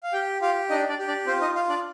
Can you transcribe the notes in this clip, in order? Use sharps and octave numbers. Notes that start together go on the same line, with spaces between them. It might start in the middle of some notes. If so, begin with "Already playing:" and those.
F5
G4 G5
F4 G4 F5
D4 D#4 D#5
D4 D5
G4
D4 D5
C4 F4 C5
D#4 D#5
F4 F5
D4 D5